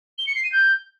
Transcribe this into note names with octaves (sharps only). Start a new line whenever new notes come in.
G7
C#7
C7
D#7
G6